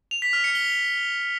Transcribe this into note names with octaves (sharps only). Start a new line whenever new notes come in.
F7
B6
F6
C#7
G7